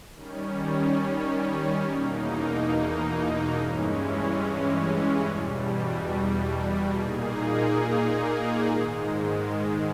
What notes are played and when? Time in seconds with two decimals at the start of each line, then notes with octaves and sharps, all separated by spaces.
0.13 D#3 G3 C#4
1.85 E2 B2 A#3 D#4
3.55 G2 E3 G#3 C#4
5.25 E2 B2 G3
6.95 A#2 A#3 D#4 G#4
8.66 G#2 D#3 G#3